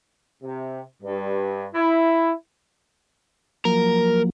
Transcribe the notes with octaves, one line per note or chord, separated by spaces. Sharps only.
C3
G2
E4
F3 F#3 A#3 A#4